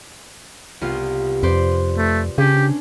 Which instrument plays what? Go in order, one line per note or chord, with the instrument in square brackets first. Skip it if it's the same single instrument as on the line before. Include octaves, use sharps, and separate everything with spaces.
[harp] C2 B3 F4
[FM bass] F2 [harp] B4 C5 D5
[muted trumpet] A3
[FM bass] C#3 [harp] C#4 D4 [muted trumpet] G4